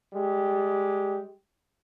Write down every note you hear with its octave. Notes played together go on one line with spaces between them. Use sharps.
G3 G#3 G4